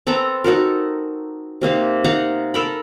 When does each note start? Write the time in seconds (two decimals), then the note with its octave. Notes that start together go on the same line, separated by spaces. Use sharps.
0.07 C4 A4 B4 A#5
0.44 D#4 F#4 A4 A#4
1.61 C3 A#3 D#4 F5
2.04 D#4 F5 F#5 A#5
2.54 A4 A#4 B5